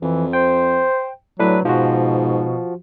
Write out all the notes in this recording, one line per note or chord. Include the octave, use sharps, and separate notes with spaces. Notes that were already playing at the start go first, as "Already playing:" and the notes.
F2 E3
C5 G5
A2 F#3 D4 B4
G#2 B2 F3 F#4